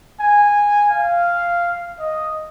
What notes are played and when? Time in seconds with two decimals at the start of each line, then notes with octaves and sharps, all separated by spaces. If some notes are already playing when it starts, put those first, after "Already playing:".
0.20 G#5
0.91 F5
1.99 D#5